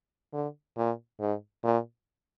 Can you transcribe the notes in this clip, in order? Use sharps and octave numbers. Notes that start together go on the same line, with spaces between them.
D3
A#2
G#2
A#2